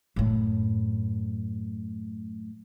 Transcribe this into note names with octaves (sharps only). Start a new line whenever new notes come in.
F#2 A2